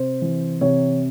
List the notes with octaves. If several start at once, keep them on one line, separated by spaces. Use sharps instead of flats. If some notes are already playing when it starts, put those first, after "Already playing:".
Already playing: C3 C5
E3
C3 C#5